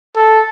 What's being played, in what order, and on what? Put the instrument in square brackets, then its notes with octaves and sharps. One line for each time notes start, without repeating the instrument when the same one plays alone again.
[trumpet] A4